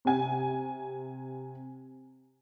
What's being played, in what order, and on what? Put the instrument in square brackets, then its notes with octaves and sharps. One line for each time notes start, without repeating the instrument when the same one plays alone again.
[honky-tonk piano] C3 G#5